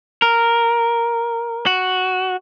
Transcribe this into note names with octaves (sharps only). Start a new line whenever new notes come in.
A#4
F#4